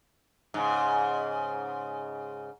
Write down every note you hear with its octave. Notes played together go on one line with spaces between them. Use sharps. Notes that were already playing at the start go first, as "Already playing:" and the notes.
G#2 C#3